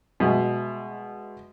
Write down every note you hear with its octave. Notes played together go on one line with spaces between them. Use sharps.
B2 G#3 E5